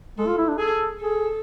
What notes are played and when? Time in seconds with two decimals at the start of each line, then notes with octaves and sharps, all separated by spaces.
0.18 G#3 A4
0.27 F4
0.38 E4
0.48 D4
0.58 G#4 A4
1.00 G#4 A4